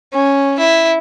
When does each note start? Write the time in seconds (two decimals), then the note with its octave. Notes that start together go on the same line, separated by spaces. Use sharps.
0.13 C#4
0.59 E4